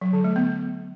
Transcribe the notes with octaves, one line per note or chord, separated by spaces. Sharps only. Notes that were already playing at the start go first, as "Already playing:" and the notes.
F#3
D3
A3
B3